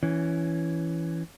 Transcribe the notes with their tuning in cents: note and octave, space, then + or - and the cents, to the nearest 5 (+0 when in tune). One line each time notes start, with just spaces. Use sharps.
E3 +5 C#4 +10